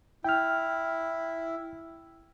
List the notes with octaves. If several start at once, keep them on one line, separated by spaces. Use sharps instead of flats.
E4 G5 F6